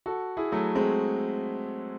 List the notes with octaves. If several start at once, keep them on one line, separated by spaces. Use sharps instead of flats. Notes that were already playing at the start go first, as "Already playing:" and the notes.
F#4 A4
E4 G#4
F#3 A3
G#3 C4